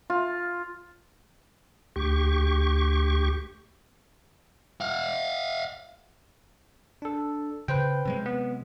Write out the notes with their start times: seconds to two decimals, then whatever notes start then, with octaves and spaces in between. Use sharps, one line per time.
0.10 F4
1.96 D2 G4 C#6
4.81 F5 F#5
7.02 D4 A4
7.68 C#3 B4 C5 G5
8.05 C3 F#3 G#3
8.26 B3